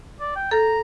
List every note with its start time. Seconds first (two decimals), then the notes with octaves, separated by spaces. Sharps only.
0.20 D5
0.36 G5
0.51 A4 A#5 G6